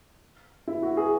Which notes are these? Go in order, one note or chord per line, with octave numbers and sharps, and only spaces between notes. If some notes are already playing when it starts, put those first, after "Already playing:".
E4
F#4
G#4